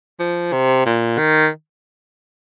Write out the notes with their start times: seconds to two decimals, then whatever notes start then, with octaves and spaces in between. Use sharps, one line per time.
0.20 F3
0.53 C3
0.86 A#2
1.18 D#3